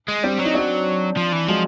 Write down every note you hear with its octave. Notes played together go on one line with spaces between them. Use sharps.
G#3
G3 C4 D4
F#3
D#4
C4 D4
F3
E3
F3 F#3 G#3